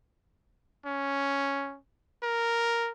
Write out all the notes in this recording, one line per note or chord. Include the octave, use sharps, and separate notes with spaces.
C#4
A#4